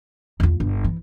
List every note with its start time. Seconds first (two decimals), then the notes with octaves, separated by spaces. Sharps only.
0.40 E2 F4
0.60 G1
0.84 E3